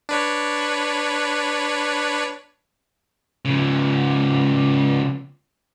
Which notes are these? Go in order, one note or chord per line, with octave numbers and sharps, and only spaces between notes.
D4 B4 C#5
C#3 F3